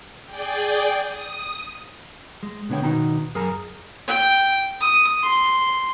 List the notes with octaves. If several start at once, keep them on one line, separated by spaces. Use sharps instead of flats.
G#4 D5 G5
D#6
G#3
B2 D3 B3 C#5 G5
B2 D#3 D#4 F#4 A#5
F#2 G#4 A#4 G#5 A#5
G5
D#6
C6